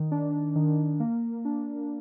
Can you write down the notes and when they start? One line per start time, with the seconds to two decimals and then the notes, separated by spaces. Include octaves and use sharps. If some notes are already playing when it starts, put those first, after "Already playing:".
Already playing: D#3
0.12 D4
0.56 D#3
1.00 A#3
1.45 D4